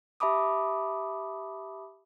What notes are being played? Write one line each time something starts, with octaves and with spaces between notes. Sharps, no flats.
G4 E5 A5 B5 D6 D#6